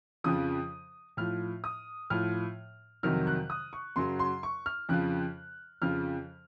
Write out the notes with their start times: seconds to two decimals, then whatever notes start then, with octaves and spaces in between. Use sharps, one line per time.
0.24 F2 C#3 F3 D#6
1.17 A2 F3 F6
1.64 D#6
2.10 A2 F3 F6
3.03 F2 C3 D#3 F#3 F6
3.27 F#6
3.50 D#6
3.73 C#6
3.96 F#2 C#3 F#3 C6
4.19 C6
4.43 C#6
4.66 F6
4.89 F2 C#3 F3 F#6
5.82 F2 C#3 F3 F6